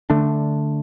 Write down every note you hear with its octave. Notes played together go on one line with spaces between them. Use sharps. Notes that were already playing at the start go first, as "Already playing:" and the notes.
D3 A3 D4